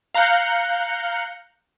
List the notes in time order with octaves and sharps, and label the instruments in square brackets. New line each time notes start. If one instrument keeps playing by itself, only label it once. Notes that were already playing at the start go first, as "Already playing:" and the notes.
[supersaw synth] F5 A#5 F#6 G6 C#7